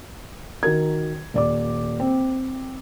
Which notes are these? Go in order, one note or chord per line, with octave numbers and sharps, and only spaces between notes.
D#3 F#4 A#4 G#6
D#1 D5 D6
C4